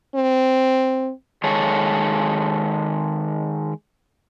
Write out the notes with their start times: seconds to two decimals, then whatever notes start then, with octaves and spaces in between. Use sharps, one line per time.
0.15 C4
1.44 D#3 G#3 A4 C#5